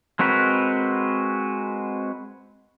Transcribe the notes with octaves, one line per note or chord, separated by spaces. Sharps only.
G#3 C4 F#4 A#4 B4